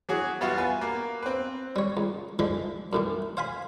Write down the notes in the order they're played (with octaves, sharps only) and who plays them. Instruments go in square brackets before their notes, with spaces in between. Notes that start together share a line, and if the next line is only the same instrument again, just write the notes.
[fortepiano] E3 F#4 G#4 C#5
G3 B3 F4 F#4 E5
B4 G#5
A#3
C4 B4
[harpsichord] G3 C#5
C#2
D3 E3 F3 G#3 B4
F#2 A2 E3
C5 F5 G#5 B5